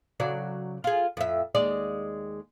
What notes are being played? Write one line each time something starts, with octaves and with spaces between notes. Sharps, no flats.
C#3 F#3 D5
F4 G#4
F2 E5
D#2 G#3 D5